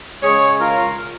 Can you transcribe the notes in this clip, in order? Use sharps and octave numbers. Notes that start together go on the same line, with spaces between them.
C#3 G#3 G#4 C#5
F4 A#4